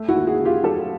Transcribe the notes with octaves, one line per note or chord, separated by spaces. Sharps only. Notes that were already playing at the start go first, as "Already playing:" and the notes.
Already playing: A3
E4 F#4
D#2
F#4 G#4
C#3
F4 G4
F#3 G4 A4